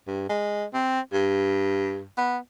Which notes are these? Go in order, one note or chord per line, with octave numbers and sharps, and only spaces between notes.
G2
G#3
C4
G2
B3